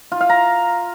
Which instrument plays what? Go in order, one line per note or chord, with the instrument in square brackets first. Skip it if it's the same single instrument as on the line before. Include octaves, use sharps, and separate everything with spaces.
[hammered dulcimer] F4
F5
A#5